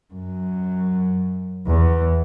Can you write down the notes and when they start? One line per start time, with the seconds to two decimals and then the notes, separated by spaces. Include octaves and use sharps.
0.14 F#2
1.67 E2